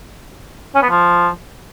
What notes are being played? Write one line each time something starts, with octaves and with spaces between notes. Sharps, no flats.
C#4
B3
F3